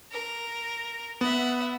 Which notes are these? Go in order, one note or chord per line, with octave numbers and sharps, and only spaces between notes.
A#4
B3 E5 F#5